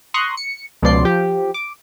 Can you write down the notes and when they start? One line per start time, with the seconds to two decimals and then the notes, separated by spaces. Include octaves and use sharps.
0.14 A#5 C6 C#6 D#6 F#6
0.37 C#7
0.83 C#2 B2 F3 D5 C6 C7
1.05 F3 G4
1.54 D6